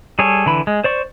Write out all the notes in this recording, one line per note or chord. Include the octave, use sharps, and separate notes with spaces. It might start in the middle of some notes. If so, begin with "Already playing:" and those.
G3 G#4 A4 C#5
D3 E3 B5
G#3
C5 D5 C#6